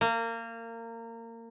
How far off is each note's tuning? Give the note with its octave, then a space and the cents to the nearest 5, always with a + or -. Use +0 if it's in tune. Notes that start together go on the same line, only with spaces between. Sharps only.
A#3 -25